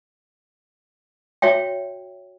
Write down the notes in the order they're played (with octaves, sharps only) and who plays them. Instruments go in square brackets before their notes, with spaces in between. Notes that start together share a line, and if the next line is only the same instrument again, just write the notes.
[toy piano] F#4 C#5 E5 G5